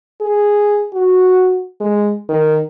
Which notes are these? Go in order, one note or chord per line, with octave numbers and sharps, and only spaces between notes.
G#4
F#4
G#3
D#3